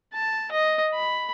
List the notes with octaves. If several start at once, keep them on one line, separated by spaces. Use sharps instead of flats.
A5
D#5
B5